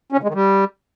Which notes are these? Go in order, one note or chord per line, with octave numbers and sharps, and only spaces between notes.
C#4
C#3
G#3
D#3
G3